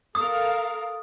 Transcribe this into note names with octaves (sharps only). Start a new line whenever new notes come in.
A4 A#4 F5 D#6